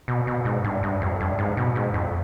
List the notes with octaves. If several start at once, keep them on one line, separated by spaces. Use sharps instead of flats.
B2
B2
G#2
G2
G2
F2
G2
G#2
B2
G#2
F2